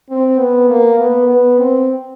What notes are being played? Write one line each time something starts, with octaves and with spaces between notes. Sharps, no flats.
C4
B3
A#3
B3
B3
C4